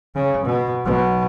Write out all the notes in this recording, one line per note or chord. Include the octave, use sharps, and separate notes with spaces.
C#3
B2
B1 B2